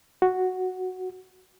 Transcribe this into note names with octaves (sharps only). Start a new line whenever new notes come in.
F#4